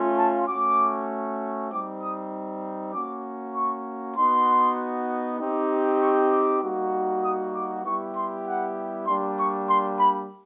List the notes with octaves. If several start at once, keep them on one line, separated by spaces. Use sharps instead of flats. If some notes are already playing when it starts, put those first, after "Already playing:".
Already playing: A3 C#4 F4
A5
A3 C#4 F#4 D6
G3 C4 D#4 D6
D#6
A#3 C#4 F#4 D6
C#6
B3 D#4 F#4 C6
C4 D#4 G4
C#6
D6
G3 A#3 D#4 F#4
D#6
D6
G3 B3 E4 G4 C#6
C6
F#5
G3 A#3 D4 G4 C6
C#6
C6
B5